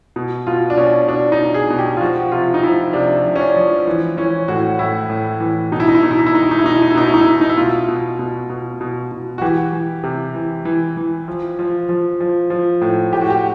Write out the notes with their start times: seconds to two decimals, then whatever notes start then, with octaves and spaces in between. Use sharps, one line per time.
0.16 B2
0.47 B2 F4
0.70 D4
0.77 B2 C#4
1.08 B2 D4
1.32 D#4
1.39 B2
1.54 G#4
1.70 B2
1.79 G4
1.97 F4
2.01 F3 F#4
2.32 C3 F4
2.54 D#4
2.62 F3 E4
2.93 C3 D4
3.24 F3
3.36 C#4
3.40 D4
3.56 F3
3.87 E3
4.17 E3 C#4
4.48 A2 F#4
4.79 A2 E4
5.10 A2
5.40 E3
5.72 B2 D#4
5.80 E4
5.88 D#4
5.95 E4
6.03 B2 D#4
6.11 E4
6.19 D#4
6.26 E4
6.34 B2 D#4
6.43 E4
6.51 D#4
6.58 E4
6.64 B2 D#4
6.75 E4
6.82 D#4
6.90 E4
6.95 B2 D#4
7.06 E4
7.14 D#4
7.21 E4
7.27 B2 D#4
7.41 D#4
7.49 E4
7.57 B2 F4
7.88 B2
8.19 B2
8.50 B2
8.81 B2
9.12 B2
9.38 F#4
9.42 E3 G4
9.73 E3
10.04 C3
10.35 E3
10.65 E3
10.97 E3
11.28 F3
11.59 F3
11.89 F3
12.21 F3
12.50 F3
12.81 A2
13.13 A2 G4
13.21 F#4
13.30 G4